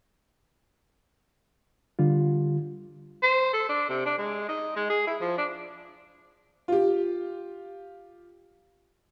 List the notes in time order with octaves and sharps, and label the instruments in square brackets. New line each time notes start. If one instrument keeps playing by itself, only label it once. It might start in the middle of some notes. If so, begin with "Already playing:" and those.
[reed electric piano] D3 G3 F4
[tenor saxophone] C5
A4
D4
C3
D4
G#3
D#4
G#3
G#4
E4
F3
D4
[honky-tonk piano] F4 G4